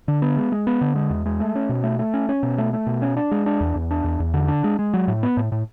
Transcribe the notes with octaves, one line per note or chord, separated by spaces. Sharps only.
D3
B3
G#3
G#3
B3
D3
G#3
E2
G#3
A3
C#4
B2
A3
A3
C#4
C#4
B2
A3
A3
B2
C#4
D4
G#3
D4
E2
E2
D4
E2
E2
D3
D4
G#3
G#3
F#3
A2
B3
A2
A2